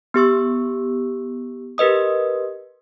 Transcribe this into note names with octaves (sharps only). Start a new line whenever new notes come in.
B3 G4 C#6 E6
G4 A#4 B4 D#5 D#6